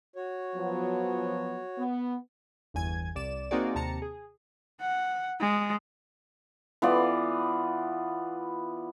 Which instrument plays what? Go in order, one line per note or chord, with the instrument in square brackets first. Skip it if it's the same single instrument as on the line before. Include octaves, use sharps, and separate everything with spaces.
[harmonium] F#4 C#5
[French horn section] F3 F#3 B3
B3
[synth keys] G1 E2 G#5 G#6
C2 D5 E7
A#3 C4 D#4 F#4 G#4 D5
D#2 C3 A5 A#5 C#7
G#4
[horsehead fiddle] F#5
G#3
[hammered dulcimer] E3 B3 F4 D5